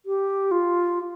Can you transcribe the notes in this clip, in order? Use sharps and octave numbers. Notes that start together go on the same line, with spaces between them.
G4
F4